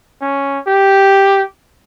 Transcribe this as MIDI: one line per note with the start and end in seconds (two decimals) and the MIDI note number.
0.21 0.58 61
0.67 1.42 67